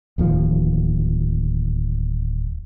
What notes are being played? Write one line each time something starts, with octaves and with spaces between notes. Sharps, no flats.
D1 D#2 F3